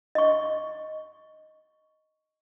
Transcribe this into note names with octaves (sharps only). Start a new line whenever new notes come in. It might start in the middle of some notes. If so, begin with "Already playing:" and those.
D#5 C#6